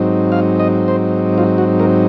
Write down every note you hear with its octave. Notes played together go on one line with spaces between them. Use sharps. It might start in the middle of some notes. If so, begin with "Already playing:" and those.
Already playing: G#2 F#3 C4 D#4
F5
D#5
C5
F4
F#4
A#4